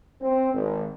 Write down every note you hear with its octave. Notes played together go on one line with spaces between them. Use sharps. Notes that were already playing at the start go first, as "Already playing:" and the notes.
C4
G#1